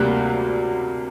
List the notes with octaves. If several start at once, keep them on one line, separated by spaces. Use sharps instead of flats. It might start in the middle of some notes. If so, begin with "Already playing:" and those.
Already playing: D2 C3 G3 A#3 D4 F#6